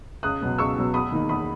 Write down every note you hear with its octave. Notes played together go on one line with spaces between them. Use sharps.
C#2 D#6 F#6
B2 F#3 B3
C#2 C#6 E6
B2 F#3 B3
E2 B5 D#6
D#3 A#3 D#4
E2 B5 D#6